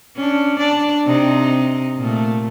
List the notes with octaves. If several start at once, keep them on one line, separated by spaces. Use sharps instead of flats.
C#4 D4
D4 D5
C3 C4 D#4
A#2 A3